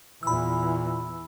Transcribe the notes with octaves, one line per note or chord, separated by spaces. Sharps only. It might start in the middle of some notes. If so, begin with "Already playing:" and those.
E2 A#2 E3 B5 E6